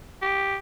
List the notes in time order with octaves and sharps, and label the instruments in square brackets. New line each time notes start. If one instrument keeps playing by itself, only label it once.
[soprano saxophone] G4